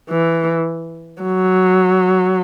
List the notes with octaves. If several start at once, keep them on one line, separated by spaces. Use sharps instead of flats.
E3
F#3